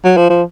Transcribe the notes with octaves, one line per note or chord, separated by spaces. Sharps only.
F#3
F3
F3